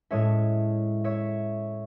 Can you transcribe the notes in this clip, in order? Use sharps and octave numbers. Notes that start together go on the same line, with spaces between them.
A2 G#3 C#4 C#5 E5
C#5 E5